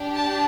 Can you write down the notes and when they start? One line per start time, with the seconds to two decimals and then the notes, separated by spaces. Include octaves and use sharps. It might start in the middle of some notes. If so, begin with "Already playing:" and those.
Already playing: D4 G4
0.15 A5